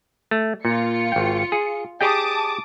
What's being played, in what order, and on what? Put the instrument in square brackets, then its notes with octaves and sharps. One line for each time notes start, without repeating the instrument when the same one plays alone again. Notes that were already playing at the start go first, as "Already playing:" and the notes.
[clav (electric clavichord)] A3
[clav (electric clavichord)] A#2 [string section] F4 C#7
[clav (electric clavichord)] G#1 G5
G#4
[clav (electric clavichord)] G4 G#4 G5 [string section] A5 D6 D#6